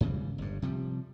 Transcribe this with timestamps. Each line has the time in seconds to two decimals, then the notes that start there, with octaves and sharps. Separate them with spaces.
0.01 G#2 C#3 E3 G3
0.38 G1 G2
0.62 C3 F3 G3